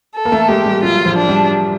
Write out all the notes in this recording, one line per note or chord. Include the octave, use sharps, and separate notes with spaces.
A4
A#3
A3
G#3 G4
G3
F#3 F4
F3
D4
G3